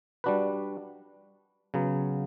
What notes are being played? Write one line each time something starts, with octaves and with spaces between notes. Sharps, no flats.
G3 D4 F#4 B4
C#3 F#3 B3